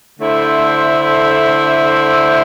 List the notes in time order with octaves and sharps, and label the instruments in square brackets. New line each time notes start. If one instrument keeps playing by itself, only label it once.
[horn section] D3 A3 E4 C5